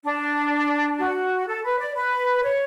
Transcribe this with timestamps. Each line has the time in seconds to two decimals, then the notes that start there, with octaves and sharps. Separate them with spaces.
0.04 D4
0.98 F#4
1.47 A4
1.63 B4
1.78 D5
1.94 B4
2.43 C#5